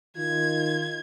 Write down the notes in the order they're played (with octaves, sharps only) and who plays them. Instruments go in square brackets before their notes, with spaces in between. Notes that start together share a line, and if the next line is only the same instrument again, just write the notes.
[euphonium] D#3 [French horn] F4 [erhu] G#6